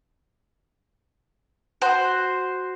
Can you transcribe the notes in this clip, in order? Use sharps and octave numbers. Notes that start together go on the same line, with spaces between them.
F#4 C5